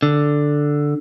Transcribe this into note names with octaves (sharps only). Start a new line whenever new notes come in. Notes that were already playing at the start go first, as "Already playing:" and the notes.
D3